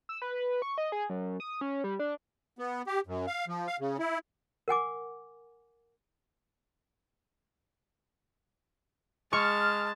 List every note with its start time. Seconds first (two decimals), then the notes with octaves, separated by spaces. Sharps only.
0.09 E6
0.22 B4
0.62 C#6
0.78 D#5
0.92 G#4
1.10 F#2
1.40 D#6
1.61 C#4
1.84 G3
1.99 D4
2.59 B3
2.87 G4
3.07 F#2
3.27 F5
3.48 F3
3.67 F5
3.80 C#3
3.99 E4
4.68 A#4 F#5 G#5 D6
9.33 G#3 A5 C#6 F6